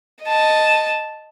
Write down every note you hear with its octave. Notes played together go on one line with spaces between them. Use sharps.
D#5 A5